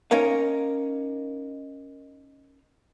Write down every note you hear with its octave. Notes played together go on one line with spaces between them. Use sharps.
C#4 D#4 A#4 F5